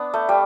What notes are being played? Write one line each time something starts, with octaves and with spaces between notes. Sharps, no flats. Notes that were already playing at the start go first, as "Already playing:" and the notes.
Already playing: B3 D4
A3
G3